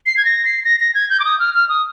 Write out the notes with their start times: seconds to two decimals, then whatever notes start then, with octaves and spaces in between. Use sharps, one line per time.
0.06 C7
0.17 G#6
0.25 A#6
0.45 C7
0.65 A#6
0.80 A#6
0.95 G#6
1.10 G6
1.20 D6
1.25 D#6
1.39 F6
1.54 F6
1.69 D#6